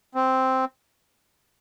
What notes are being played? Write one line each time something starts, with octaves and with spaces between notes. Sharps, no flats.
C4